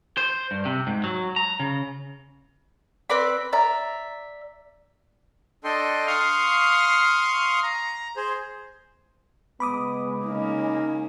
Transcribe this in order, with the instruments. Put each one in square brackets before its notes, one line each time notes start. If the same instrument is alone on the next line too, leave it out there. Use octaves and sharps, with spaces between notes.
[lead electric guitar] C5
G2
C3
G#2
F#3
A#5
C#3
[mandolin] C4 B4 D5 B5
D5 E5 A#5
[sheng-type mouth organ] D4 A4 D#5 G5 C6
F5 C6 C#6 D#6 F6
A#5
G#4 C5
[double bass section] C#3 G#3 [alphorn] B3 [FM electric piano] B5 D6 D#6
[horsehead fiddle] A#3 C#4 [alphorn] D#4